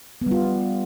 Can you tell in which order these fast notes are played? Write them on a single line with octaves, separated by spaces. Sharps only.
B3 G3 F4